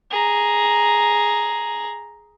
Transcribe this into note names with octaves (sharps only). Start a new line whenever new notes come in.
G#4 A#5